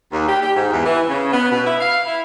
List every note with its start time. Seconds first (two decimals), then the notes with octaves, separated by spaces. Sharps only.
0.12 D#2
0.28 G4
0.42 G4
0.56 G#2
0.72 E2
0.84 E3
1.08 C#3
1.32 B3
1.51 B2
1.65 E4
1.81 F5
2.06 E4